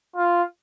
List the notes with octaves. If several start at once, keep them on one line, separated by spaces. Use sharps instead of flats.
F4